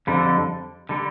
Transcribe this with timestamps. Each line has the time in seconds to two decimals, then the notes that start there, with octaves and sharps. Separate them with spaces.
0.07 F2 D3 G3
0.89 D3 G3